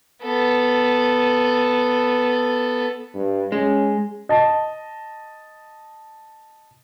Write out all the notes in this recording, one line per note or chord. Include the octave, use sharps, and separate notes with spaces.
B3 A4
G2
G#3 C#4
D#5 A5